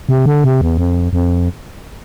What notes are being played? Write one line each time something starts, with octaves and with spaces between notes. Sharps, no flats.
C3
D3
C3
E2
F2
F2